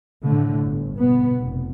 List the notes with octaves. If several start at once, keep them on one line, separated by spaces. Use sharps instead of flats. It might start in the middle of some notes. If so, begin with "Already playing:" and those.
A2 D3 A3
G1
B2 B3
F1